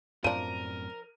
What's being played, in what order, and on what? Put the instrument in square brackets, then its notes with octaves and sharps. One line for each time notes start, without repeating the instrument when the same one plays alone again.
[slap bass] F#2 A2 C4 [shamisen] F3 D4 [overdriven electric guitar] A#4 [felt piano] D#7